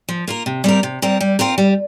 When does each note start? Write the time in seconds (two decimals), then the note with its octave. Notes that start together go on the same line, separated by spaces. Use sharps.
0.09 F3
0.27 A#3 F4 A#4
0.46 C3
0.64 G3 C4 A#4
0.83 C3
1.02 G3 C4 A#4
1.21 G3
1.39 C4 F4 A#4
1.58 G3